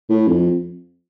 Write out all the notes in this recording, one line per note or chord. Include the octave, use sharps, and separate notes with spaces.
A2
F2